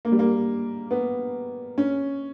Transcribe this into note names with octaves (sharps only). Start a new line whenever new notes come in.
A#3
G3
A#3
B3
C#4